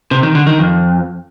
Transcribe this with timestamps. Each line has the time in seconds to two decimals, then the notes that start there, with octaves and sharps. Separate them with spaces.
0.11 C3
0.23 D#3
0.35 D3
0.47 D#3
0.58 F2